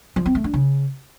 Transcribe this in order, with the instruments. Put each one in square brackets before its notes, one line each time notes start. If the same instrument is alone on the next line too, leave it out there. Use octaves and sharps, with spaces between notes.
[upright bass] F3
C4
A3
D4
C#3